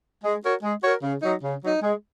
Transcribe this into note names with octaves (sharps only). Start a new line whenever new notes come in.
G#3
F#4 A#4 C#5
G#3
F#4 A#4 C#5
C#3
F#3 D#4
C#3
F#3 D#4
G#3